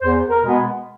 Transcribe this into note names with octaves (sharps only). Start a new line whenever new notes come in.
E2 C5
A#4
B2 G#3 B3